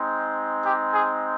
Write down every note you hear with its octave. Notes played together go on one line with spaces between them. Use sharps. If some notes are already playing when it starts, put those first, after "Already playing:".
Already playing: G#3 C4 D#4
G4
G#4